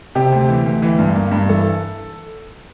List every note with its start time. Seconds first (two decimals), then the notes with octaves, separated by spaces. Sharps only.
0.15 C3 G4
0.32 D2
0.48 E3
0.66 D2
0.82 E3
0.99 G2
1.16 A#3
1.31 G2
1.48 E3 A4